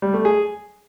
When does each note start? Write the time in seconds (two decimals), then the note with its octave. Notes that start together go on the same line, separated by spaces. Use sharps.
0.02 G3
0.14 A3
0.25 G#4